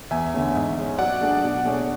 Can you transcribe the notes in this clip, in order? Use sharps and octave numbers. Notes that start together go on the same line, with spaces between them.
E2 E5 G#5
D3 A3 C#4
G#2
G#3 C#4
F#3 D5 F#5
A3 D4 G#4
B2
A3 D4 G#4 C#5